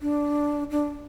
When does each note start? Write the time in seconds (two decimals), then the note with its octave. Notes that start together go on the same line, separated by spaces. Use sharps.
0.02 D4
0.71 D4